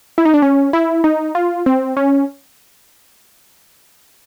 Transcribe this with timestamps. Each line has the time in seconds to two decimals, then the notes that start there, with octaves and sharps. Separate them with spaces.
0.18 E4
0.25 D#4
0.34 D4
0.42 C#4
0.73 E4
1.04 D#4
1.35 F4
1.66 C4
1.97 C#4